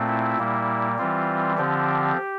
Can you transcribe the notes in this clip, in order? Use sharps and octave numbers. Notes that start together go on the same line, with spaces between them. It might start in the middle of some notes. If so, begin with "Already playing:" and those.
Already playing: A#2 A3 C4
E4
A#2 G3 A#3
E3 G3 C4 F4
D3 F3 C4 G4